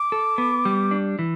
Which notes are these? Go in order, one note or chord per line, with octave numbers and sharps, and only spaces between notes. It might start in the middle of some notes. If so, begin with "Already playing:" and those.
Already playing: D6
A4
B3
G3
D4
E3